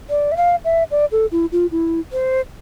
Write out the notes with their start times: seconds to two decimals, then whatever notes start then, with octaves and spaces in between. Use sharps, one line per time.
0.09 D5
0.32 E5
0.37 F5
0.64 E5
0.91 D5
1.12 A4
1.32 E4
1.52 F4
1.72 E4
2.12 C5